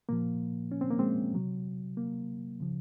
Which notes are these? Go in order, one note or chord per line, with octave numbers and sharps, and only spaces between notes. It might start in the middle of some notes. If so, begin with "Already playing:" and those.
A#2 F3 A#3
C#4
C4
A#3
G#3 C4
C3 F#3
A#3
C#3 F3